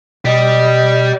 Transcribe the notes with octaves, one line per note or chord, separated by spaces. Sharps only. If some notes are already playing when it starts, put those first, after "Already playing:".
B2 G4 D5 D#5